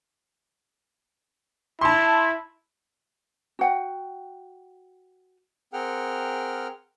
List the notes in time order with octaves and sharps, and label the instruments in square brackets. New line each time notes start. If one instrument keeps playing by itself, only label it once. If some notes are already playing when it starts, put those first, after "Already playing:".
[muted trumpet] E4 [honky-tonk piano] A5 C6
[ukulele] F#4 F#5 G5
[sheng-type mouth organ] C4 G#4 A#4 F#5 G5 F6